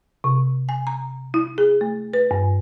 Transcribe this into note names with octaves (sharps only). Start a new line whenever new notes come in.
C3
G#5
A#5
E4
G#4
A3
B4
G2